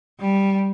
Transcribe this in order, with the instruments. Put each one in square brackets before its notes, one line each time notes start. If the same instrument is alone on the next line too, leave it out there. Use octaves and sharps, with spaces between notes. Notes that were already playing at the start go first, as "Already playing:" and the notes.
[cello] G3